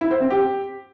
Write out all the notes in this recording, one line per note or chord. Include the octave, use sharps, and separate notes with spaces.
E4
C5
C4
G4